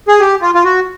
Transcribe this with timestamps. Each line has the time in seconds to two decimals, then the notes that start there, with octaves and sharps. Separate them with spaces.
0.08 G#4
0.20 G4
0.42 F4
0.55 F4
0.65 F#4